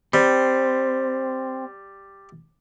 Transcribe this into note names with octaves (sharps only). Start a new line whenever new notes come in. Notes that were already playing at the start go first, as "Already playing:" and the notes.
G3 C4